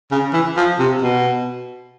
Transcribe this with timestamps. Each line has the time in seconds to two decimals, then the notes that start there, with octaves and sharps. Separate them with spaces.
0.11 C#3
0.33 E3
0.57 F3
0.79 C3
1.02 B2